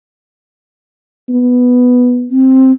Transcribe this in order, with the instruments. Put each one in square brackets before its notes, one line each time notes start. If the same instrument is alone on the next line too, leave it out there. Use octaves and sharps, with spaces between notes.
[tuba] B3
[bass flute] C4